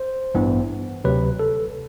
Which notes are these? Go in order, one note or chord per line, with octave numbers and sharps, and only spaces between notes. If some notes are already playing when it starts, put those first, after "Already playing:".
Already playing: C5
A1 G2 E3 B3
D2 C3 F#3 B4
A4